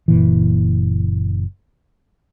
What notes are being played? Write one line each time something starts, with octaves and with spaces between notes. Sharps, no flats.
F#1 A#2 E3